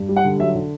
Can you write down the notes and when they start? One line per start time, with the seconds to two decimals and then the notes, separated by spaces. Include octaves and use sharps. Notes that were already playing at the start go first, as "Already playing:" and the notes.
Already playing: G2
0.08 G3
0.16 F#5
0.24 D3
0.39 F#3 E5
0.55 D3